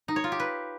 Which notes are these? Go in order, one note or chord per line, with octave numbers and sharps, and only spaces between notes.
D#4
C#5
F4
G4
B4